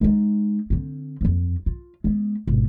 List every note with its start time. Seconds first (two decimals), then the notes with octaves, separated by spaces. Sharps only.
0.01 G#3 D#4
0.70 D3 C4
1.21 D1 F2
1.66 F4
2.04 G#3 B3
2.47 G#1 B2